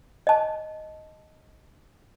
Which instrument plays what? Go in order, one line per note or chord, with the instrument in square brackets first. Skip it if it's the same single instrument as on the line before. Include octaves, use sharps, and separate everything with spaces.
[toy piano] D#5 A5